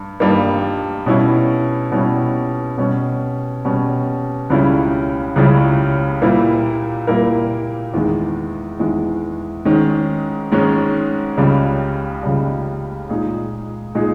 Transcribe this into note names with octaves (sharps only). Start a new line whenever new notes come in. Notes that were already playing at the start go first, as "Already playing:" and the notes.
Already playing: G2
G2 G3 A#3 D#4
B2 G3 C#4 E4
B2 G3 C#4 E4
B2 G3 C#4
B2 G3 C#4
C#2 C#3 G3 C#4 E4
C#2 C#3 G3 C#4 E4
A#2 G3 A#3 E4 A#4
A#2 G3 A#3 E4 A#4
E2 D#3 G#3
E2 D#3 G#3
G#2 D#3 G#3 C#4
G#2 D#3 G#3 C#4
C#2 C#3 G3
C#2 C#3 G3
A#2 G#3 D#4 G#4
A#2 G#3 D#4 G#4